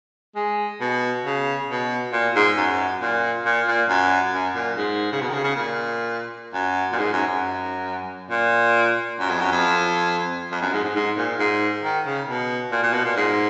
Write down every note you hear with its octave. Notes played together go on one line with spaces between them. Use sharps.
G#3
B2
C#3
B2
A#2
G#2
F#2
A#2
A#2
A#2
F#2
F#2
A#2
G#2
C#3
B2
D#3
C#3
C#3
A#2
F#2
A#2
G#2
F#2
F#2
A#2
F#2
F2
F#2
F2
F2
F#2
G#2
G#2
G#2
A#2
G#2
D#3
C#3
B2
A#2
A#2
B2
A#2
G#2